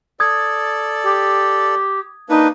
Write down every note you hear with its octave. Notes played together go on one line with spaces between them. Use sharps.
A4 D5 D#6 G#6
G4
A#3 D4 D#4 B4